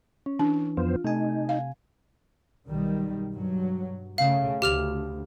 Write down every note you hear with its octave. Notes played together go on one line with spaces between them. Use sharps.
C#4
E3 D4
F2 B3 F4 C5
C3 A3 D#4 G#5
F5
B1 D#3 G3
G2 F#3
C#3 A3 F5
D2 G4 F6 F7